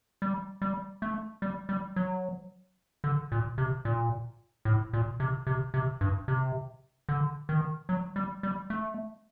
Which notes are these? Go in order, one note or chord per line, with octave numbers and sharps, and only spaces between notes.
G3
G3
A3
G3
G3
F#3
D3
A#2
C3
A#2
A2
A#2
C3
C3
C3
G2
C3
D3
D#3
F#3
G3
G3
A3